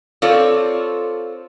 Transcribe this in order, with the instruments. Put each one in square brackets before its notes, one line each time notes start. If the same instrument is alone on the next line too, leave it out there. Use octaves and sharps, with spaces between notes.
[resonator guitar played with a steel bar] C4 F4 A4 C#5 D5